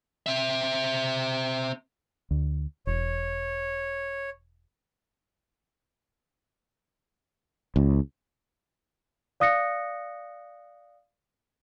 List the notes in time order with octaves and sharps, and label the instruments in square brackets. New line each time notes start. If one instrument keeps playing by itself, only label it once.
[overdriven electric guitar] C4 E5
[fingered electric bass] D2
[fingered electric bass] E1 [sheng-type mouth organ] C#5
[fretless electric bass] C#2
[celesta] D5 F5 D#6 F#6 A#6 C#7